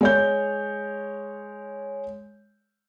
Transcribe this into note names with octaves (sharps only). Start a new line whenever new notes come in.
G#3 C#5 G6